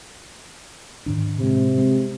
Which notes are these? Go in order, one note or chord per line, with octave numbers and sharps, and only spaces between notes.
G#2 D#3 D4
A2 C3 G#3
G#3 C4